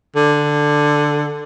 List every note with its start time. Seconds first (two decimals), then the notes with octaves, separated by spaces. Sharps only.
0.16 D3